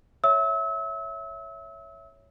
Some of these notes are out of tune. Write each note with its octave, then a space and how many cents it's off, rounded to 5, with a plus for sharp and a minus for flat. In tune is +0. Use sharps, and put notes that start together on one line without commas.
C#5 +0 E5 +0 E6 -35